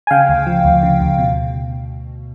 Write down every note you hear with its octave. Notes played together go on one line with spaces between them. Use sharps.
G#5
C#3 F5 G5
D2
F3
D2
C#3
D2
B2